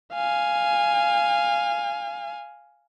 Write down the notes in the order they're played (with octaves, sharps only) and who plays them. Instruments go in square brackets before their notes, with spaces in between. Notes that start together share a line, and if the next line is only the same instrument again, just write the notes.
[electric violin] F5 G#5